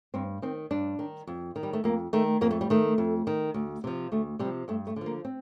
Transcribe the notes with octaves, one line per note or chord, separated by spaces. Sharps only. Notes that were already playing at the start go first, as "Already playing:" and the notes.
G2 C4
D#3 C4
G2 D4
D#3
F2
D#3
G3
A3
F2 A#3
D#3 A3
F2 A#3
A3
G3
D#3 A3
F2
D#3
D2
C3 F3
D2 A3
C3 G3
F3
G2 A3
A3
D3 F3
A#3
C4